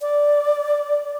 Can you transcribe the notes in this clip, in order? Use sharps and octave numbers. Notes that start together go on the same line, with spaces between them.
D5